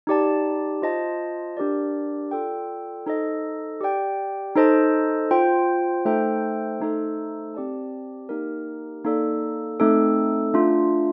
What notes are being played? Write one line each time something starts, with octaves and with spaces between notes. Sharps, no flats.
D#4 G4 D5 A5
F4 C5 D#5 A5
D4 G4 A#4 D5
F4 A4 D5 G5
D#4 A4 C5 D#5
G4 D5 G5
D#4 A4 C5 D#5 A5
F4 C5 G5
A3 D#4 A4 C5 G5
A3 D#4 A4 C5
C4 G4 D5 A5
A#3 D#4 G4 A#4
A#3 D#4 A4 D5
A3 C4 D#4 A4
A3 D4 F4